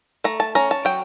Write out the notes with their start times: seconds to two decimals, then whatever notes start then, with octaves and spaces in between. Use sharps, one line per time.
0.24 A3 A#5
0.40 A5
0.55 C#4 A#5
0.71 A5
0.85 F#3 G5